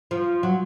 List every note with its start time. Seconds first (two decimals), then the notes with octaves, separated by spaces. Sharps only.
0.11 F3
0.43 F#3